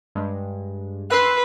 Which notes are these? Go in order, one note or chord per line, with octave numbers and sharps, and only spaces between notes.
G2 G#3
B4 C6 E6 F#6